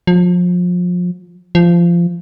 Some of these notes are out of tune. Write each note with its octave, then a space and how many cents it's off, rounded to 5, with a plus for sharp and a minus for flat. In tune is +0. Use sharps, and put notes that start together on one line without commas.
F3 +30
F3 -20